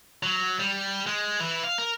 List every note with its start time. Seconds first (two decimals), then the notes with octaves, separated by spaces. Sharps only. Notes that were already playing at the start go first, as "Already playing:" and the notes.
0.23 F#3
0.59 G3
1.07 G#3
1.40 E3 E4
1.64 F5
1.78 A#4